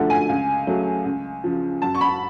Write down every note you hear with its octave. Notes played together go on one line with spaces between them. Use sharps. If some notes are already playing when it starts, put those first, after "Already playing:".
Already playing: F#2 D3 F3 A3 F#5
G#5
C#2
C#3 F#3 A3
C#2
C#3 F3
F#2 A5
C#6
B5